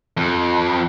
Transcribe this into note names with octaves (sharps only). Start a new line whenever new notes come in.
F2